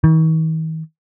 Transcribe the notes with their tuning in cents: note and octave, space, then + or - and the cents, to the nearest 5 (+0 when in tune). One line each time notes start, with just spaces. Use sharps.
D#3 +45